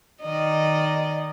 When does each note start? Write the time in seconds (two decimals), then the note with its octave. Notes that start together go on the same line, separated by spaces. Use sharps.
0.22 D#3 D5 D#5